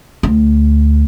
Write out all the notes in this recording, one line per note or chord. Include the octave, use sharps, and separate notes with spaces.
D2